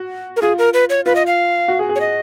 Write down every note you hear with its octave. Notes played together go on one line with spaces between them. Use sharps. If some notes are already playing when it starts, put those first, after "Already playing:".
Already playing: F#4
A#4
F4 G#4
A#4
B4
C#5
F4 B4
D#5
F5
F#4
G#4
G#4
C#5
D#5